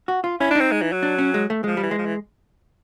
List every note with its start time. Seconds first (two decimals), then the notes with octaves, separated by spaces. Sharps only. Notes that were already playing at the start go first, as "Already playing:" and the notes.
0.08 F#4
0.24 F4
0.40 C#4 E4
0.50 D4
0.55 D#4
0.61 C4
0.72 G#3
0.82 E3
0.92 F#3
1.03 D4
1.19 C#4
1.34 G#3
1.50 A3
1.64 F3 G#3
1.77 G3
1.83 E3
1.91 G#3
1.98 F3
2.06 E3